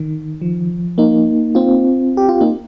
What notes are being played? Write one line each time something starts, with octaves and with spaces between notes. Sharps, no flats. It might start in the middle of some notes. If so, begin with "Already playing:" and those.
Already playing: D#3
F3
A#3 D#4
C4 F4
G4
F4
A#3 D#4